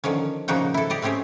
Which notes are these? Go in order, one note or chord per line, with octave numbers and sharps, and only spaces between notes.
D3 D#3 F3 C#4
A#2 C#3 F3 D#4 F#4 G5
E4 A4
G4 D5 D#5
A3 C4 C#4 G4 G#4